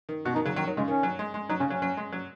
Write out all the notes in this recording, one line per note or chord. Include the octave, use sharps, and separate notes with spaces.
D#3
B2 F#4
D#3 D#4
C#3 F#3
D#3 F#3
D#3 F#3
C#3 G#3
D#3 C#4
F#3
G#3
G#3
F#3 D#4
C#3 C#4
F#3 C#4
F#3
G#3
F#3